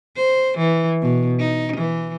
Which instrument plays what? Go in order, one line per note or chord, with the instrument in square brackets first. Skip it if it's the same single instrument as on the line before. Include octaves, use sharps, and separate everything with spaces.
[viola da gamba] C5
E3
B2
D#4
E3